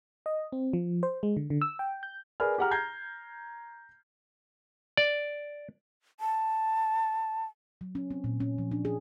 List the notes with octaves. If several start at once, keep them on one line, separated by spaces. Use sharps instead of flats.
D#5
C4
F3
C5
G#3
D3
D3
E6
G5
G6
G#4 A#4 B4 D5 G#5 F6
G4 G#4 F#5 A#5 F6
A#5 F6 G6 G#6 A#6 C7
D5
A5
F#3
C#4
C4
A#2
C#4
F3
D4
G#4